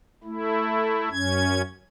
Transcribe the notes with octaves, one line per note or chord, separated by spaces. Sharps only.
A3 E4
F#2 C#4 G#6